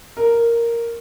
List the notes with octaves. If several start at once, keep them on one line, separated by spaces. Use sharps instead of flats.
A#4